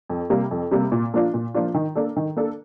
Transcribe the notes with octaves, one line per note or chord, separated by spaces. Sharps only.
F2
C3 G3 A#3
F2
C3 G3 A#3
A#2
F3 A#3 D4 F4
A#2
F3 A#3 D4 F4
D#3
A#3 D4 A4
D#3
A#3 D4 A4